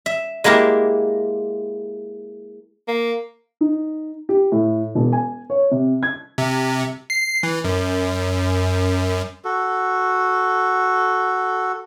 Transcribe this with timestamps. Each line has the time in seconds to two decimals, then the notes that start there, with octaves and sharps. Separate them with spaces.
0.06 E5
0.44 G#3 A#3 E4 G4 A#4
2.88 A#3
3.61 D#4
4.29 G4
4.52 A2
4.95 E1
5.13 G#5
5.50 C#5
5.71 C3
6.03 G#6
6.38 C3
7.10 C7
7.43 E3
7.64 F#2
9.44 F#4 A4